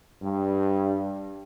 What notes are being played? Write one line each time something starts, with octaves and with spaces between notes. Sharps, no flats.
G2